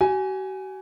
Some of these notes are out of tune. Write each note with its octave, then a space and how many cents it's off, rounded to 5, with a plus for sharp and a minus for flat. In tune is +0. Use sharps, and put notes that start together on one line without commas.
F#4 +45 G#5 +0